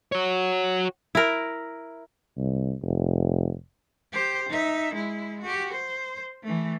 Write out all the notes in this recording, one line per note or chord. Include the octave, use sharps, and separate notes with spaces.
F#4 C#5
E4 A#4
C2
F1
G4 C5
D#4 E5
G#3 E4
F#4 G4
C5
E3 A3